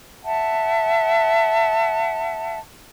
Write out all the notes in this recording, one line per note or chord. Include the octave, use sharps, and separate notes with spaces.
E5 F#5 A5